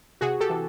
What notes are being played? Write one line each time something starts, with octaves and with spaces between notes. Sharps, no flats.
C3 F#4 G#4
G4 A4
E3